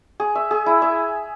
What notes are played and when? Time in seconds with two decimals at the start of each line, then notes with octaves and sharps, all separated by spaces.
0.20 G#4
0.35 E5
0.51 G#4
0.66 E4
0.82 E5